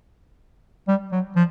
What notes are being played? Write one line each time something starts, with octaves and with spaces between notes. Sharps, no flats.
G3
F#3
F3